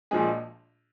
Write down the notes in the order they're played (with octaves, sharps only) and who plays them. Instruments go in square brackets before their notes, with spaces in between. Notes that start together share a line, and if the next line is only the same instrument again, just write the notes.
[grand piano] A#1 A#2 F3 G#3 G#4